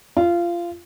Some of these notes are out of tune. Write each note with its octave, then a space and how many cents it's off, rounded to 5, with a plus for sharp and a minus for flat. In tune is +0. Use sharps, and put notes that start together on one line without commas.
F4 -20